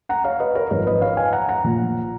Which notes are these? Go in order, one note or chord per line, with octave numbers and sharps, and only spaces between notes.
F#5 A#5
C#5 F5
B4 D#5
A#4 C#5
G#1 G#2 F3 A#4 C#5
B4 D#5
C#5 F5
F5 G#5
F#5 A#5
F#5 A#5
A#1 A#2 F3